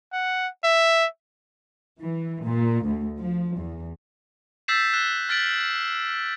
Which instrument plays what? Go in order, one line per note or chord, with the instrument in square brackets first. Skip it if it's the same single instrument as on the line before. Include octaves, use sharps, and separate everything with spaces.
[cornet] F#5
E5
[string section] E3
A#2
D2
F3
E2
[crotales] E6 G6 A6 B6 C7 E7
F#6 B6 E7
F6 A6 B6 D7 F#7